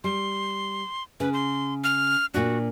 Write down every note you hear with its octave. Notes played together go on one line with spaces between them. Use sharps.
G3 C6
C#3 B4
C6
F6
A#2 D4 F#4